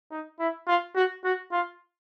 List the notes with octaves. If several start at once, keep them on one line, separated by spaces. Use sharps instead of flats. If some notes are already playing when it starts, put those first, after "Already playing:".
D#4
E4
F4
F#4
F#4
F4